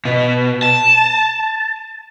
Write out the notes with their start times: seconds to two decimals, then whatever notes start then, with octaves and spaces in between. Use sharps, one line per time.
0.05 B2
0.63 A5